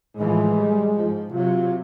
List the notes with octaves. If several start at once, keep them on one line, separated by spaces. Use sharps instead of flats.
A2 E3 F3 G#3
G3
G#2 F3
C3 F#3 F4